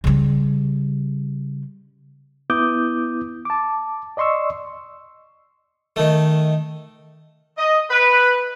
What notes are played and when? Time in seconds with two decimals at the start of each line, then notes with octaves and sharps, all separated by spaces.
0.04 C#3 G3
2.50 B3 E4 D6 D#6 G6
3.45 A5 D6
4.17 D5 D#5 C6 C#6 E6
5.96 D#3 A3
7.58 D#5
7.90 B4